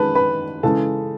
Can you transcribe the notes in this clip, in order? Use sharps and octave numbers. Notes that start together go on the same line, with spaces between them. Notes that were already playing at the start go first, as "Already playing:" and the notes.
Already playing: D#3 G#3 B4 A5 B5
B4 B5
C#3 E3 G#3 A4 A5